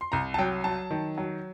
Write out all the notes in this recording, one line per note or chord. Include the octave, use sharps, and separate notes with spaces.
C6
C2 A#5
A5
F#3 G5
F#3 A5
D#3
F#3